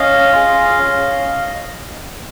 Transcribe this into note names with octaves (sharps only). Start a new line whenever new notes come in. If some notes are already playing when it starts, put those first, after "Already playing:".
Already playing: C#4 D#5 F5
F4 G#4
C#4